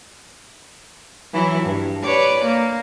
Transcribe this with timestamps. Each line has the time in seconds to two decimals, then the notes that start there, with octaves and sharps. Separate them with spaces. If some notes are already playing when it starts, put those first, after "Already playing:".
1.33 E3 F#3 E4
1.63 G2
2.03 B4 C#5 D5
2.45 A#3